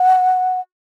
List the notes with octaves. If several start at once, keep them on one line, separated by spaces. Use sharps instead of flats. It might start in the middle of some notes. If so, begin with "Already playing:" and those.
Already playing: F#5